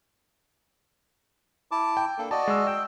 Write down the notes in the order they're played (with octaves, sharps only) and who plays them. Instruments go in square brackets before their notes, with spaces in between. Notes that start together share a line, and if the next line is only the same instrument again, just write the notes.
[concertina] E4 A5 D6
[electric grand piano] G5
[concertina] A#3 D4 A4
[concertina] F#4 D5 D#5 [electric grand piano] A5
[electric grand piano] G#3 E6
[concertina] G5 [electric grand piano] E6